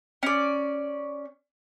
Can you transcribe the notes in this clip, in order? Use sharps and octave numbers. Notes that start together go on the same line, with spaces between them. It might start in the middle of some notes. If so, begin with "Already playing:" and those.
C#4 D5